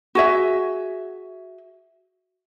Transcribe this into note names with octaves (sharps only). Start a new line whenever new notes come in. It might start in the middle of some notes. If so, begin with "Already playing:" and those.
F#4 G#4 E5